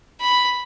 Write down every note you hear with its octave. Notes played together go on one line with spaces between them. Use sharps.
B5